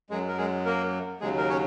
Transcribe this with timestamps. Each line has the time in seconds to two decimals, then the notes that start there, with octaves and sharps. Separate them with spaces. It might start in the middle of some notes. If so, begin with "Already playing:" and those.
0.10 F#2 F#3 G#3 G#4
0.28 A#4
0.38 G#3 G#4
0.66 A#3 A#4
1.21 D#2 C#3 F#3 G#3 G#4
1.38 A#4
1.49 C#4 C#5